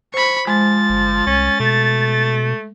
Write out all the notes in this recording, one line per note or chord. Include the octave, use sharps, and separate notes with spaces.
C5 B5 C#6
F3 G#3 A6
G1
C2 C#4
B2 A3